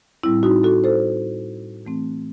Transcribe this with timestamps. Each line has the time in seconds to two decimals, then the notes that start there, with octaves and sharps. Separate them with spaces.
0.23 A2 G3 C4 E4
0.43 D#4 F#4
0.63 F#4 A4
0.84 A4 C5
1.85 E3 A3 C4